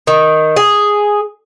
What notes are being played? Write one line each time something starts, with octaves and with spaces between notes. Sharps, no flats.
D#3
G#4